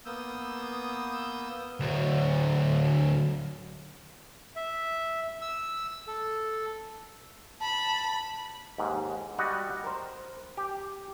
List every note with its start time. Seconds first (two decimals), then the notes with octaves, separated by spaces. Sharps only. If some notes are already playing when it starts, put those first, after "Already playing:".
0.06 A#3 B3 D#6 E6 G6
1.80 D2 F#3
4.56 E5
5.42 E6
6.07 A4
7.60 A5 B5
8.78 D#2 G#2
9.38 G3 F#4 D#5 F#5
9.84 A#4 C5
10.57 G4